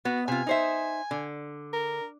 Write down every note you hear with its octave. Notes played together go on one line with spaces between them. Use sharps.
B3 F#4
C3 F4 G#5
D#4 C5 E5
D3
A#4